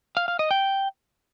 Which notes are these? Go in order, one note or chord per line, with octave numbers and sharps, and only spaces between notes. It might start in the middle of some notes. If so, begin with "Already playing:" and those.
F5
F5
D#5
G5